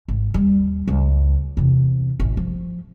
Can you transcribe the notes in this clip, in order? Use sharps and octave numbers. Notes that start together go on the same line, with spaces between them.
G#1
D#2 G3
C#2 F#2
E2 C3
A1 F#2
F3